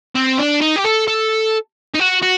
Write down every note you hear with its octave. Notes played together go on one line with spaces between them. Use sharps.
C4
D4
D#4
G4
A4
A4
D#4
F#4
F#4